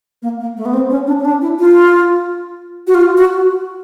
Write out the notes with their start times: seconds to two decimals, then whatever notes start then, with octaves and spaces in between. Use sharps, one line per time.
0.22 A#3
0.40 A#3
0.57 A3
0.65 B3
0.74 C4
0.90 C#4
1.07 D4
1.19 C#4
1.25 D4
1.42 E4
1.59 F4
2.87 F#4
2.95 F4
3.17 F#4